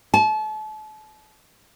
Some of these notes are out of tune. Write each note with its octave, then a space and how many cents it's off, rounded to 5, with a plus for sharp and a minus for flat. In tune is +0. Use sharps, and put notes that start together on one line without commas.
A5 -35